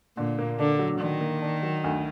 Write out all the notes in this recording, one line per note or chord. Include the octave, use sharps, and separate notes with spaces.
A#2 D3
A#3
D3 D4
F#3
D3 D#3
A#3
D4
F#3
D2